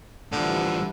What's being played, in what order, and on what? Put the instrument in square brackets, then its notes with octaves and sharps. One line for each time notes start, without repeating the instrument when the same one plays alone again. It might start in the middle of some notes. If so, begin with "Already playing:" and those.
[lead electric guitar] A2 F3 [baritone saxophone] D3 [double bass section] E3 G3